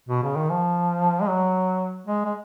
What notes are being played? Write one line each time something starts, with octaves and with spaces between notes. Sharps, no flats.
B2
C#3
D#3
F3
G#3
F#3
G#3
G#3